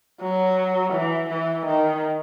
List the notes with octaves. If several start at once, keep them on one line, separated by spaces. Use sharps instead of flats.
F#3
E3
E3
D#3